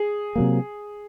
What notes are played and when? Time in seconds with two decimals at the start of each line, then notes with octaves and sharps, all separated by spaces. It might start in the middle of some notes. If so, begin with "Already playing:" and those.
Already playing: G#4
0.36 C3 F#3 A#3